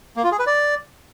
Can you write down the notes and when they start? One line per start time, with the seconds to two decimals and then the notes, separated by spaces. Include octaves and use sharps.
0.16 A#3
0.24 F4
0.31 G#4
0.39 B4
0.47 D5